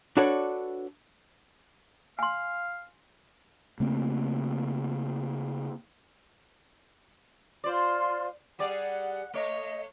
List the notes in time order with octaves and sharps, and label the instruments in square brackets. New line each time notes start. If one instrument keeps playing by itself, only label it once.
[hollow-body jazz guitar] D4 F#4 A4 B4 C#5 D5
[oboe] F5 [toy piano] G#5 C6
[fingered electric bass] C#3 A3 A#3 C4
[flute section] F4 C6 [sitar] C5 D5
[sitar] G3 G#4 D5 [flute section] F#5
[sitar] A3 C#5 [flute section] D#5